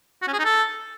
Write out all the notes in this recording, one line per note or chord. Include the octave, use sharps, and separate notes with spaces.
F#4
C#4
G#4
D#4
A4